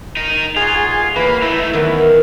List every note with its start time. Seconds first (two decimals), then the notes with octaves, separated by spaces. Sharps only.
0.17 D#4 A#4
0.56 D#4 F4 F#4 G#4
1.16 E3 F#3 A#3 B4
1.42 A3 D#4 E4
1.73 E2 D#3 E3 F#3